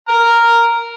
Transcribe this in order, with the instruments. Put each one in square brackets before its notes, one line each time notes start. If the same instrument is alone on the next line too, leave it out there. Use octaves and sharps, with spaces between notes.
[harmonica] A#5 F6